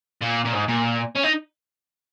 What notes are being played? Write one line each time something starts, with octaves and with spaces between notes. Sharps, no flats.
A#2
A#2
G#2
A#2
C#4
D#4